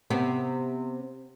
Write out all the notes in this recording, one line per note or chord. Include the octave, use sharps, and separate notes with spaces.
C3 B3 C4